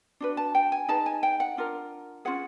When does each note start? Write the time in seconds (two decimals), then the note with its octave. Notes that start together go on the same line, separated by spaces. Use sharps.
0.20 D4 F#4 B4
0.37 A5
0.55 G5
0.72 G#5
0.88 D#4 G#4 B4 A5
1.06 G#5
1.23 G5
1.40 F#5
1.57 D4 F4 A#4
2.25 C#4 F4 G#4 F#5